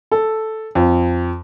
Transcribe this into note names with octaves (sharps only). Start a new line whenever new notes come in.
A4
F2